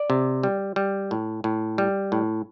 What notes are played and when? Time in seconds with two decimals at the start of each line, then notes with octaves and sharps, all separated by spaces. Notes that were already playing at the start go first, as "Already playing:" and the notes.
Already playing: D5
0.10 C3
0.43 G3
0.76 G3
1.11 A2
1.44 A2
1.78 G3
2.12 A2